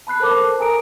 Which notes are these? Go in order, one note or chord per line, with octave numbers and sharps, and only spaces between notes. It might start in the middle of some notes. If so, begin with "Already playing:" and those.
A5 B5 F#6 C7
A4 A#4 C5 A5 D6
A4 A#4 G#5 A#5 D#6 D7